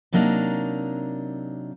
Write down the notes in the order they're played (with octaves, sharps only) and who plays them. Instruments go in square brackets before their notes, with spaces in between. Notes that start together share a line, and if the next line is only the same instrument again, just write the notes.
[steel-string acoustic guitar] C3 F#3 A#3 D4 D#4